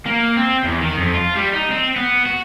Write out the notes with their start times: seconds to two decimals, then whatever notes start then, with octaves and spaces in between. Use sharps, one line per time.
0.06 A#3
0.36 C4
0.64 E2
0.81 D#3
0.98 F2
1.14 F4
1.36 G3
1.53 D#4
1.71 C4
1.96 B3
2.26 F#4